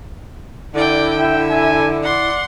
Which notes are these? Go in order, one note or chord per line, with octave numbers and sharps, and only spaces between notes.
D3 E4 D5 G5
E5 G5
G#5
D5 F#5 C6